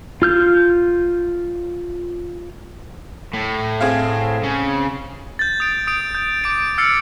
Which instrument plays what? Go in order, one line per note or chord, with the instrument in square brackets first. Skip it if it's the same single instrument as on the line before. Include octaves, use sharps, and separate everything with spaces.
[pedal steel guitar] F4 F6 G6
[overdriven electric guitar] A2
[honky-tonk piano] C4 G#4 F5
[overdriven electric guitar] C#3
[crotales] G6 A6
D#6 D7
D#6 D7
G6
D6 D7
E6 F6 A6 C7 C#7